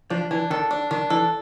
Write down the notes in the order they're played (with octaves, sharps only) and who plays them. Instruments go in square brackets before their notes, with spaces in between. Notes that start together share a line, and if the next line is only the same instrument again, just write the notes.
[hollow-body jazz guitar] F3 [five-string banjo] D4
[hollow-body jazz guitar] E3 [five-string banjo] D4
[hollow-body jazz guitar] D#3 [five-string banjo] A4
[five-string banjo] D4
[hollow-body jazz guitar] D#3 [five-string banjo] D4
[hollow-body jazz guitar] E3 [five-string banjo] A4